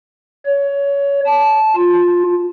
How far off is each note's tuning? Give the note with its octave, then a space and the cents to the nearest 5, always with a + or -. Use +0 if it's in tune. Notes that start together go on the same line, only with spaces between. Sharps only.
C#5 +20
A5 -15
F4 +10